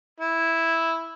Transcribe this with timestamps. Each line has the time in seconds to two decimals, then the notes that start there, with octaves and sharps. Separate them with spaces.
0.20 E4